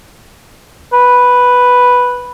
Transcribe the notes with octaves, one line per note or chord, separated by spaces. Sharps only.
B4